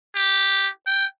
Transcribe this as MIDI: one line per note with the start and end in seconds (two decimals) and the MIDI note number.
0.15 0.69 67
0.87 1.05 79